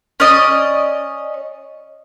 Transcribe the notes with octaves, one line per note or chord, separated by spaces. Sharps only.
C#4 D5 D#5